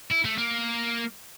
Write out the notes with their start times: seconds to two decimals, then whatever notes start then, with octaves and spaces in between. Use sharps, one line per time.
0.12 E4
0.25 A3
0.38 A#3